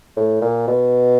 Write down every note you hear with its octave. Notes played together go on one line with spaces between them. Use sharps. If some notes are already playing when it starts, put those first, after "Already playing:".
A2
A#2
B2